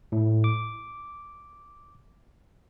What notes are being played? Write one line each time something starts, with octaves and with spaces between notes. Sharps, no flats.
A2
D6